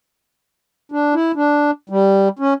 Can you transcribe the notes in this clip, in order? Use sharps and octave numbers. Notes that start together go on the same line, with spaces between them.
D4
E4
D4
G3
C#4